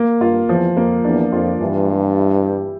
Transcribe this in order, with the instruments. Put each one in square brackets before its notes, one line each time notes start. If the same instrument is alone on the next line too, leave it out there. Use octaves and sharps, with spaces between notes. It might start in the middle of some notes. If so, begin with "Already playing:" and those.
Already playing: [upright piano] A#3
[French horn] G2 [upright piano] F4
[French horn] E2 [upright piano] F3
[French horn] F2 [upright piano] A#3
[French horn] E2 [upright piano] D4
[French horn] F2 [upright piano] F4
[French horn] G2 [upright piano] E3
[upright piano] G3
E4
G4